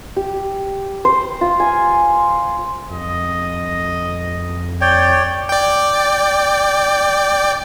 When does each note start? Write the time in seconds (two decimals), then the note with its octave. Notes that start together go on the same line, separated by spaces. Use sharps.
0.16 G4
1.05 C5
1.41 F4
1.60 G#5
2.90 F2 D#5
4.81 C#5 D5 G5 G6
5.49 D5 G5